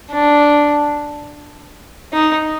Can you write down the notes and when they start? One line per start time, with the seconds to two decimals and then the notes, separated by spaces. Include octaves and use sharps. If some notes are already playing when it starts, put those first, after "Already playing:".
0.11 D4
2.13 D#4